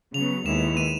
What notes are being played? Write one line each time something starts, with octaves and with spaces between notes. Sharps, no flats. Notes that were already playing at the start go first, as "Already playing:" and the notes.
C#3 F#3 B3 F7
D#2 D#3 G#3 B3 E4 E7
D#7